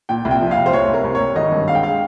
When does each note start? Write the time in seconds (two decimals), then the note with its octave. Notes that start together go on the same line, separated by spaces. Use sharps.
0.09 A#2 G5
0.25 C2
0.31 G5
0.41 F3
0.51 F5
0.57 C2
0.66 C5
0.73 C2 C#5
0.89 C2 A#4
1.04 C2
1.15 C#5
1.20 C2
1.36 G#1 D#5
1.52 G2
1.68 G#3 F5
1.75 G5
1.83 G#3 F5